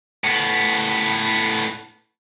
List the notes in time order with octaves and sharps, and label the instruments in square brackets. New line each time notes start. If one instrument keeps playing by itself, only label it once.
[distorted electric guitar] A2 B3